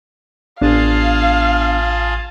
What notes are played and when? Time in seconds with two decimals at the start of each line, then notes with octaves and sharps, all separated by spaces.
0.61 A1 B3 D4 F4 G#4 F5 A5